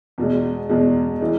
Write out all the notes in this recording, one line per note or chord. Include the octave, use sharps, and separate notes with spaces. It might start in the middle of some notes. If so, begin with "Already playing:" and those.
E2 B2 G#3
E2 B2 G#3
E3 G#3